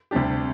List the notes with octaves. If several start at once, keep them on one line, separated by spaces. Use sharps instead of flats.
D2 C3 G3 D4 G4